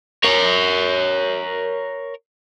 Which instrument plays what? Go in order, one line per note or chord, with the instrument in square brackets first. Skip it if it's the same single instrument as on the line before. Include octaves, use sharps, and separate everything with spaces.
[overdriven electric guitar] A#4 C#5